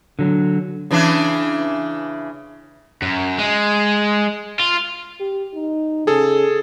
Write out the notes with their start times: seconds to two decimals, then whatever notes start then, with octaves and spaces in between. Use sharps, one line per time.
0.19 D3 F#3
0.91 C#3 E3 D4
3.02 F#2
3.39 G#3
4.60 F4
5.20 G4
5.55 D#4
6.07 C#3 G#4 A4